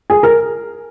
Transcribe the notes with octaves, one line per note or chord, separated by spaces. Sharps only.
G#4
A#4